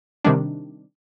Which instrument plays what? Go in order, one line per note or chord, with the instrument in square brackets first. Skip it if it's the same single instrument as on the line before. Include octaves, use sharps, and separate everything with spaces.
[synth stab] C3 D#3 G3 D4